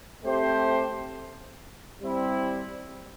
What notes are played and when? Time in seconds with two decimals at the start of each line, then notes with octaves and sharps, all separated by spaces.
0.23 A3 C4 G4 C5
2.01 G3 C4 E4